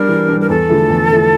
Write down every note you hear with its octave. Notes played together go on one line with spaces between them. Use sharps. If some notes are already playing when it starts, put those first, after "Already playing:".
Already playing: G3 D4 A#4
E3
G3 D4
A#4
E2 A4
D3 F3 A3 E4
E2
D3 F3 A3 E4